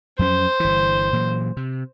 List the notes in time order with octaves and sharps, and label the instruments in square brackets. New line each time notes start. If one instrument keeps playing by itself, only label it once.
[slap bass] F2 F#3 C#4 [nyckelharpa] C5
[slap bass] G1 E3
A#2 E3 F#3
C3